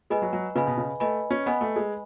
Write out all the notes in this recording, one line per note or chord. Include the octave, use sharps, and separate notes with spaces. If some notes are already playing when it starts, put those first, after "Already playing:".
G#3 B4 D#5 G#5 B5
F#3
F#3
C#3 B4 D#5 G#5 B5
B2
C#3
A3 B4 D#5 G#5 B5
C#4
B3 B4 D#5 G#5 B5
A3
G#3